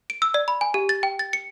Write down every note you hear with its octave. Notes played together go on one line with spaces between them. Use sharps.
D7
E6
D5
B5
G#5
G4
A6
G5
A6
C#7